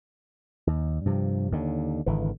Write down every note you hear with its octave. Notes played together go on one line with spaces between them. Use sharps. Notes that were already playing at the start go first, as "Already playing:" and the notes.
D#2
G2 C3 F3
D#2 D3
G#1 D3 E3